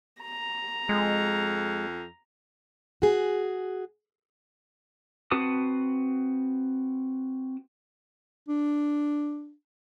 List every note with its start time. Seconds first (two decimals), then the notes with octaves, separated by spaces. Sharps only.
0.22 A#5
0.89 F2 G#3
3.02 F#4 G#4
5.31 C4 F#4 B4 A5 D#6
8.48 D4